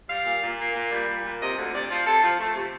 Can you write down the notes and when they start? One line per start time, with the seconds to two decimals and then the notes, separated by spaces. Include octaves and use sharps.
0.09 G3 F5
0.26 A#2
0.43 A#2
0.59 A#3
0.76 A#2
0.91 G3
1.08 A#2
1.25 A#2
1.40 C3 D#5
1.57 D2
1.74 C3 D5
1.90 F3
2.06 C3 A4
2.23 F3
2.39 A3
2.55 C3